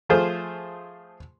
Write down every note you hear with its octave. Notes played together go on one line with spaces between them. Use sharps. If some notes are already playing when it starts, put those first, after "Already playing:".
F3 A3 F4 G#4 C5